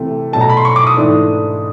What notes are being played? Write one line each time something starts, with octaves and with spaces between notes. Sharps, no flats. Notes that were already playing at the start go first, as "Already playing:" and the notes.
Already playing: C3 E3 A3 C4
B2 F#3 A3 A5
A#5
B5
C6
C#6
D6
D#6
G#2 E3 A3 D4